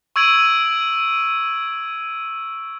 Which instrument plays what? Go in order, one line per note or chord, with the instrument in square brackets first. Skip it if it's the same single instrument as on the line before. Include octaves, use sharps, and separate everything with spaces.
[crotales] C#6 E6 G#6 D7 D#7 F#7